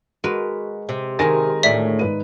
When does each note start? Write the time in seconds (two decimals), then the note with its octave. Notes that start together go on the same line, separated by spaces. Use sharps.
0.24 G#3 F#4 A#4 B4
0.89 C3
1.19 D#3 G#3 D#4 A#4 G#5 A#6
1.63 D2 A2 D5 E5 B6
1.99 G#2 B4 D#7